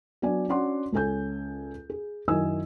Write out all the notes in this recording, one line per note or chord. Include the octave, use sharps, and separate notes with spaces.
F#3 B3 D4 D5 G#5
C#4 D4 F#4 D5 F#5 C6
C#2 C#4 A4 G#5 G6
G#4
F#2 D#3 E4 D#5 G#5 E6